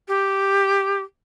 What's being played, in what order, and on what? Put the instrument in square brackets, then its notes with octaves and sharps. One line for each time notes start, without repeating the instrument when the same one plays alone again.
[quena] G4